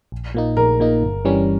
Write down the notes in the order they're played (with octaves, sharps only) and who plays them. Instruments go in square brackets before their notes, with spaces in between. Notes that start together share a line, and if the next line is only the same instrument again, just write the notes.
[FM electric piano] A#1
A#2 A#3 D#4
[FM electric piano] A#1 [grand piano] A#4
[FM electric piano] A#2 A#3 D#4
G1
G2 E3 G3 C#4